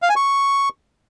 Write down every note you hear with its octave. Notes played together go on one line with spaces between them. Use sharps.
F5
G#5
C#6